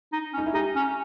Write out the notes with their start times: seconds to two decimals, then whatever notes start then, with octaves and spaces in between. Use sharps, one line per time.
0.12 D#4
0.33 C#4
0.38 D#4
0.46 E4
0.53 D#4 G4
0.76 C#4